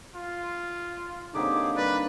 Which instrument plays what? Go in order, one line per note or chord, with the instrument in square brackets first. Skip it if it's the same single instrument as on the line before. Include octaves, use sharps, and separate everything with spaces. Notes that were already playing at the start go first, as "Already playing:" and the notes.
[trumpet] F4
[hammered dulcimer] D3 A#3 C4 [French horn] D#4 [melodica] G4 G#4 D6
[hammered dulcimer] G3 [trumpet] B4 [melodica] D5